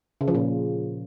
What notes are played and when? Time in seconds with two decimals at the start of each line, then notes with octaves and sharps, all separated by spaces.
0.21 C#3
0.28 F3
0.35 A#2